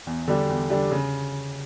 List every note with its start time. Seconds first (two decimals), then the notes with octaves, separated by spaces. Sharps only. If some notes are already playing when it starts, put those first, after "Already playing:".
0.07 E2
0.28 D3 G3 D4 G4
0.49 E2
0.70 D3 G3 D4 G4
0.91 C#3